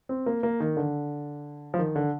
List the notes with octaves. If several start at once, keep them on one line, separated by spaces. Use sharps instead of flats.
C4
A#3
A#3
D#3
D3
F3
D#3
D3